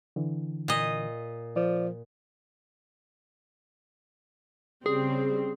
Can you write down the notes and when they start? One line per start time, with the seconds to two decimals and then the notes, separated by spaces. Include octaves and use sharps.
0.16 D3 E3
0.68 A#2 D#5
1.56 F3 D5
4.86 C#3 G3 C4 G#4